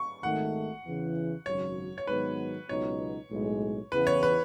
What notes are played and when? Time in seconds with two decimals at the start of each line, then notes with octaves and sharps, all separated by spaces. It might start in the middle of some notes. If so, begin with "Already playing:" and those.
Already playing: C#6
0.23 G#1 G#2 D#3 A3 F#5
0.85 E2 C#3 E3
1.46 G#1 F#2 C#3 F#3 C#5
1.98 C#5
2.07 G#2 D#3 F#3 B3 B4
2.69 C#2 B2 F#3 B3 D#4 C#5
3.30 B1 A2 G#3
3.91 E2 C#3 E3 B3 B4
4.07 C#5
4.23 B4